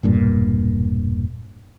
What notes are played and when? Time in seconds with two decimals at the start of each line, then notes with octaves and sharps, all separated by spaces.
0.03 E1 G2 A#2